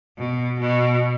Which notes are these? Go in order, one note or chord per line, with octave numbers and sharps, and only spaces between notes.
B2
B2